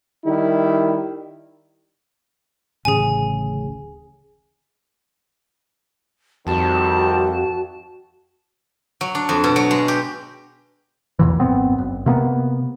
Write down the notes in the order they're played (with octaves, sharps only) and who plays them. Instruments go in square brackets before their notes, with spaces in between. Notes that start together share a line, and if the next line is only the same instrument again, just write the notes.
[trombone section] D#3 G3 E4
[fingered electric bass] D1 A1 C#3 [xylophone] G#4 G#5
[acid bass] F2 [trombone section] D#3 G3 C4 [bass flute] F#4 [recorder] A5
[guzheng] F#3
D4
F2
B2
F#3
G#3
G4
[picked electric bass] E2 A#2 E3
G#1 F#2 B3 C4
F#1
C3 A#3 B3